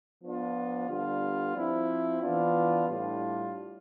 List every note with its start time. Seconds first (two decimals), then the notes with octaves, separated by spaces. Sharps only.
0.23 F3 B3 D4 F4
0.88 D3 G3 B3 F4
1.55 F3 C4 E4
2.20 E3 B3 D4 F4
2.86 A2 G3 D4 F4